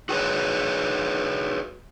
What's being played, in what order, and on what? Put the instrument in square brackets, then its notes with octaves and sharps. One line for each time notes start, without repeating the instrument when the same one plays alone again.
[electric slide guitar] F#4 G#4 B4 C#5